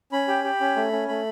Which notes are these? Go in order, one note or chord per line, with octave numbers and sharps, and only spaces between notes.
C#4 B5
G4
G4
C#4
A3
C#4
A3 B5